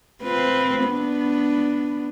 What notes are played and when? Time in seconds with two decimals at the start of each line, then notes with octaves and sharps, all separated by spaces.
0.23 C4 F4 B4
0.83 B3 D4